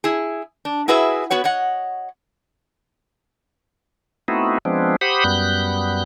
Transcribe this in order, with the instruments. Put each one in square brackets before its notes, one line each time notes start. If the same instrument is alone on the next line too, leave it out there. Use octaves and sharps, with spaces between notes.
[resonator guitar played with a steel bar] E4 G#4
D4
E4 F#4 G#4 B4 E5
B3 F#4 B4 C#5
C#5 D#5 F#5
[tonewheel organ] A3 B3 C4 D#4 E4 F#4
F3 G#3 B3 C4 D4
G4 C5 F#5 B5 D#6
F#2 G3 B3 F#6 G6